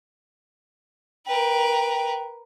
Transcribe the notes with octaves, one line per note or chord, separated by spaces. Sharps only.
A#4 B4 G5